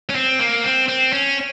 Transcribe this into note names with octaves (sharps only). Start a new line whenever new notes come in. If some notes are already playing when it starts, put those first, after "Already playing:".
C#4
C4
A#3
C4
C4
C#4